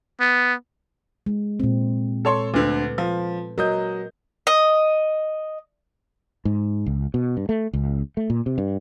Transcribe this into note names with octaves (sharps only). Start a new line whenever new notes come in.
B3
G#3
A#2 C4
A4 C#5 C6
D2 D3 A4 B4
F3
F#3 A#4 D#5 G6
D#5
G#2
C#2
B2
G2
A3
C#2
A3
A#2
C3
G2